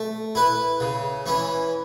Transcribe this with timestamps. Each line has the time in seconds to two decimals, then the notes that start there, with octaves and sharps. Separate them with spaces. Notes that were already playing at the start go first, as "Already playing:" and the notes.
Already playing: A3
0.35 E4 B4
0.80 C#3
1.26 E3 C#4 E4